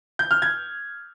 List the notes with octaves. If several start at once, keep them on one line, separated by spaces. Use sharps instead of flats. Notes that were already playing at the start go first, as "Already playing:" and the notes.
G6
F6
G#6